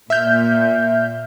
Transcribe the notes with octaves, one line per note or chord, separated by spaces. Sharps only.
A#2 E5 F6 G6